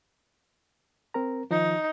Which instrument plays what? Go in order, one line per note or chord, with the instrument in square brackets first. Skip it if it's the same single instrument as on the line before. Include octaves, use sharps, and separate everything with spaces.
[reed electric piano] C4 A#4 A#5
[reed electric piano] D#3 F3 [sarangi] D#4